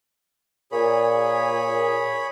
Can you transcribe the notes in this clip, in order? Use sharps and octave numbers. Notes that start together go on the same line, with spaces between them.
A#2 G#4 C#5 B5